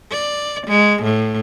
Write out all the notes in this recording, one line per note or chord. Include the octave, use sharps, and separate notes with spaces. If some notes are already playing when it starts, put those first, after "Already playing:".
D5
G#3
A2